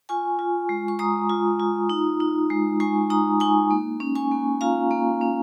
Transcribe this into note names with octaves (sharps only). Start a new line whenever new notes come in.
F4 G#5 C#6
F4
G#3
C#6
G#3 A#5 D#6
F4
F4
D#4
D#4
G#3
G#3 G#5 C#6
D#4 A#5 D#6
D#4 G#5 C#6
A#3
C#4
G#5 C#6
A#3
F4 F5 A#5
A#3
C#4